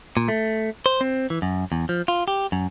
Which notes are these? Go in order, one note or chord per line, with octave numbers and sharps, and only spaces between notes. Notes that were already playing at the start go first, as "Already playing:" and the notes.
A#2
A3
C5
C4
E3
F#2
E2
F3
F4
G4
F#2